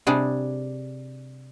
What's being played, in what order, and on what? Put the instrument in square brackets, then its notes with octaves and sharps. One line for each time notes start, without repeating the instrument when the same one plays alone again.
[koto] C3 G3 D4 G#4